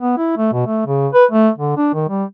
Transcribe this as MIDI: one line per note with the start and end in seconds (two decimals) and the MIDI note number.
0.01 0.17 59
0.18 0.34 64
0.37 0.49 57
0.53 0.66 47
0.66 0.83 57
0.87 1.08 49
1.13 1.25 71
1.31 1.49 57
1.58 1.77 50
1.77 1.90 62
1.94 2.08 51
2.09 2.25 55